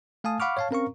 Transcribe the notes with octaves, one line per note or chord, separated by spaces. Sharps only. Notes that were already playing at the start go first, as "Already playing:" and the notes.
A3 F5 G#5 A5 D#6
F5 F#5 B5 C#6 D6 F6
C#5 F5 A5
C4 C#4 A#4 F5 A#5 C#6